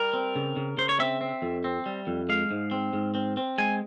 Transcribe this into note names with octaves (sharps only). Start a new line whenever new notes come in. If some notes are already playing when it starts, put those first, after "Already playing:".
Already playing: G3 A#4
C4
C#3
C#3
C#3 C5
C#5
C4 E5
C4
F2
C4
G3
F2
G#3 F5
G#2
C4
G#2
C4
C4
G#3 G#5